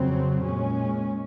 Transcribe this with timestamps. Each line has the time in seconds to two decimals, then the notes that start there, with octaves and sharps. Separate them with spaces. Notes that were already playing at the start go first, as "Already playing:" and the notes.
Already playing: F2 C#3 F#3 C4
0.44 A#2 G#3 C#4